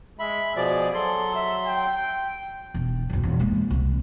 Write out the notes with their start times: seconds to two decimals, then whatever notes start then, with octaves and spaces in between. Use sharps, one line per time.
0.19 G#3 E5 B5
0.56 B2 F3 G#4 D5
0.94 F#3 A4 C6
1.35 E5
1.67 G5
2.74 E1
3.10 F#1 B1
3.24 E1
3.40 G#3 A#3
3.70 C2 C3